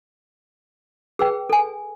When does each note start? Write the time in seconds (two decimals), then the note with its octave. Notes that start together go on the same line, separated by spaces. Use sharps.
1.19 G#4 B4 G5
1.50 A4 G#5